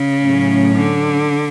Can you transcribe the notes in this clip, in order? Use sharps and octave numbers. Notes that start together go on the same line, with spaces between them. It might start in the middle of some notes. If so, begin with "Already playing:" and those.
Already playing: C#3
A2 F#3 C#4
D3